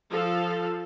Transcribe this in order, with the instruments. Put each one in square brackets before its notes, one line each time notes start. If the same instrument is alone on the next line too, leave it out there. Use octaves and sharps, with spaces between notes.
[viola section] F3 A4 F5